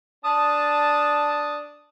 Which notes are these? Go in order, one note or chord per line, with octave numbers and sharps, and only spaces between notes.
D4 A5 D#6